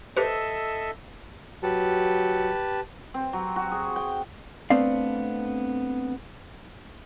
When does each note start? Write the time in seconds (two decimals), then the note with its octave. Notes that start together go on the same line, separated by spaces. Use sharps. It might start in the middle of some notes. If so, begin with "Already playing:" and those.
0.17 G4 A4 B4 C5 D#5 E5
1.63 F#3 G4 B4 A5
3.14 C4
3.33 F#3
3.56 F#4
3.72 G#4
3.96 G5
4.70 A3 B3 C4 D4 D5 F5